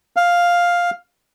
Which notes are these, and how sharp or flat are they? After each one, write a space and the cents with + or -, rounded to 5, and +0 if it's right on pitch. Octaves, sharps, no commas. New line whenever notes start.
F5 +5